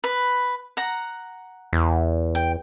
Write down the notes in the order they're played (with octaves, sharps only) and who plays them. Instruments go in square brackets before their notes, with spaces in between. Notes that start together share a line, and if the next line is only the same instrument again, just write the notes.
[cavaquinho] B4
F#5 A#5
[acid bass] E2
[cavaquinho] G5